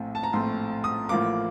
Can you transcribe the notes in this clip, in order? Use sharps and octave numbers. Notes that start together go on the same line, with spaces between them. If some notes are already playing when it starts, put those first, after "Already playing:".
Already playing: A#1 A2 A3 C4
A5
A#5
A#1 A2 A3 C4 C6
D#6
A1 A2 F3 A#3 D6